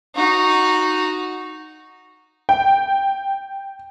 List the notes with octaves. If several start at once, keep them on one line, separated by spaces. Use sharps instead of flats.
D#4 F#4
G5